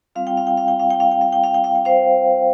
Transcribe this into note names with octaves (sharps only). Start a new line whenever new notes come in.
G3 C4 F4 F5
G5
F5
G5
F5
G5
F5
G5
F5
G5
F5
G5
F5
G5
F5
G5
C5 F5